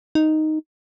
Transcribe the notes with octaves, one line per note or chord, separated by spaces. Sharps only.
D#4